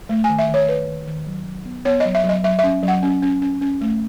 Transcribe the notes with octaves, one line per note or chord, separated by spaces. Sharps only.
A3
G#5
D#3
E5
D#3
C#5
D#3 B4
D#3
D#3
F#3
F#3
B3
B3 C#5
F#3 D#5
E5
F#3 D#5
F#3 E5
C#4 E5
F#3
F#5
C#4
C#4
C#4
C#4
A3